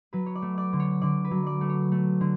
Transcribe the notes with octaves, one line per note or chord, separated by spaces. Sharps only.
F#3 B4
C#5
D5
A3
D5
D3
C#5
D3 D5
B4
F#3
D5
A3
C#5
A3
D3